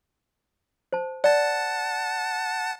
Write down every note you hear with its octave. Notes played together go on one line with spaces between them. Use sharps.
C5 A5
D5 F#5 A5